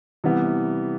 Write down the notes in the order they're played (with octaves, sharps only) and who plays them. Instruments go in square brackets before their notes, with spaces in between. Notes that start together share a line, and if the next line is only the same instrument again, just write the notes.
[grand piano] C3 E3 G3 B3